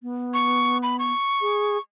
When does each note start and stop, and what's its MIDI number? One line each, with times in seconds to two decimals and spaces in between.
0.03 1.13 59
0.34 0.78 85
0.83 0.97 83
0.99 1.80 85
1.41 1.77 68